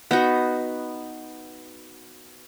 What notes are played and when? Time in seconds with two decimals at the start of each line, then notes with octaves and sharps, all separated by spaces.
0.11 B3 D#4 F#4